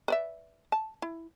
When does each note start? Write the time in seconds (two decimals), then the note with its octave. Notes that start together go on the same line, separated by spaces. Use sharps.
0.08 B4 D5 E5
0.72 A5
1.02 E4